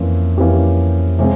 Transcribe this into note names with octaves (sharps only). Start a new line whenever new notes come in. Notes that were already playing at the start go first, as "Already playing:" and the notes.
Already playing: F2 E3 A#3 C#4
F2 E3 A#3 C#4 G4
C3 F3 G#3 C#4